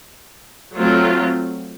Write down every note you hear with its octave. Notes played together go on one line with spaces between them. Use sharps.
F#3 A3 C4 F4